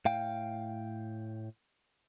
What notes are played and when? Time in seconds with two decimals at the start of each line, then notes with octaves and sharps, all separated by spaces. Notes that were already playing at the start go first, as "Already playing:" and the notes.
0.05 A2 F5 G5